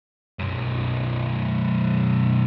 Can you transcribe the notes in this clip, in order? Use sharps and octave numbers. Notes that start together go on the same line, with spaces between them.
B1 F#2